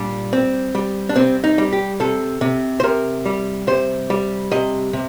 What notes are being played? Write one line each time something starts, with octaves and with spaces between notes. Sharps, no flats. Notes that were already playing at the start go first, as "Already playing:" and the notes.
Already playing: A#2 G3 D4
C4
G3
D4
C3 C4
D#4
G3
G4
C3 A4
C3
C5
C3 A#4
G3
C3 C5
G3
C3 D#5
C3